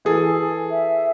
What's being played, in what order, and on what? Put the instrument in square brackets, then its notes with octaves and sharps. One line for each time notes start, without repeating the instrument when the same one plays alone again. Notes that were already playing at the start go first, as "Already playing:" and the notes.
[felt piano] E3 G#4 A4
[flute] E5